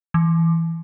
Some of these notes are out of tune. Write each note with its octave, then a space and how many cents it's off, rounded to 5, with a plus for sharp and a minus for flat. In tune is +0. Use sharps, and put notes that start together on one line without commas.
E3 +0